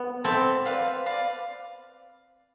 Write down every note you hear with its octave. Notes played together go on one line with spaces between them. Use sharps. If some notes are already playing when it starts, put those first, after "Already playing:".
Already playing: B3
C4 A4 E5 B5 D6
B4 D5 F5
B4 D5 F5